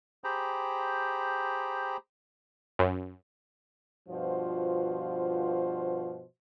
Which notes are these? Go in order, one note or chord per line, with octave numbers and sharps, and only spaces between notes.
G4 G#4 C5 G5 A#5 B5
F#2
G2 B2 F3 F4 F#4 C5